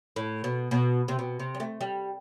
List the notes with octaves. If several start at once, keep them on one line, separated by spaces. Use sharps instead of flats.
A2
B2
B2
C3
B2
C3
G3
A3
G3